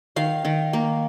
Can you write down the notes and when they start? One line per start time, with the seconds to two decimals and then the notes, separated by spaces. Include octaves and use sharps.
0.16 D#3 F5
0.45 D#3
0.73 A#3